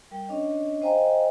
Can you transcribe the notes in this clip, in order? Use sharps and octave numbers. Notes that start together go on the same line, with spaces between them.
G3 A#4 G5
C#4 D4 C#5 D#5
C5 D#5 F5 G5 G#5 A#5